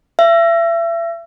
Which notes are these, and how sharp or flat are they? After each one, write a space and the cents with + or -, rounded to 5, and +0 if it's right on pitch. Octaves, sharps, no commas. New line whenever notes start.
E5 +35